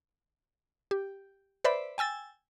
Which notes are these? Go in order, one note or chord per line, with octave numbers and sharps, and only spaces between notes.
G4
B4 C5 D5 E5 B5
G5 G#5 E6 A6